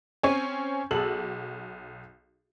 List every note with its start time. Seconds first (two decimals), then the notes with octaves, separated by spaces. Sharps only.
0.24 C4 C#4 G#5
0.91 B1 G#4 A4 F#7